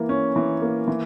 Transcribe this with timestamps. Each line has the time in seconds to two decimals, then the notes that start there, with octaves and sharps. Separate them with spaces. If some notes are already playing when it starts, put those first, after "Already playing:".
Already playing: E3 A#3
0.09 C#4
0.36 E3
0.62 A#3
0.88 E3